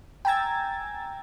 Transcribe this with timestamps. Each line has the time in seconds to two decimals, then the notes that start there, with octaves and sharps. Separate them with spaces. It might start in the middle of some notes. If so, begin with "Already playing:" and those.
0.25 G5 G#5 A#5 E6 G#6 A6